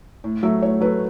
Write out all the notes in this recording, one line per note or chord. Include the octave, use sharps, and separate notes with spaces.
A2
F#3 A3 E5
A2 C#5
F#3 A3 B4